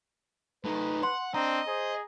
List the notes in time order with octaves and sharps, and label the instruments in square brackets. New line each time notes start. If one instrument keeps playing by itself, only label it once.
[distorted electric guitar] A3 D#4 [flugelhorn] B4
[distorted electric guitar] F#5 [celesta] C6
[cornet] C4 [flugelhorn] D4 [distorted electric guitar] D#5 [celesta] A#5
[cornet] G#4 [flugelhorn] C5